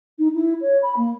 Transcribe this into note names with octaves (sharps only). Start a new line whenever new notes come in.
D#4
E4
C#5
B5
A#3